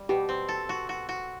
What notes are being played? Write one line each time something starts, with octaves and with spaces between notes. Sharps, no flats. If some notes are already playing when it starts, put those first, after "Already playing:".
Already playing: G3
B2 G4
C4
A4
F#4
F#4
F#4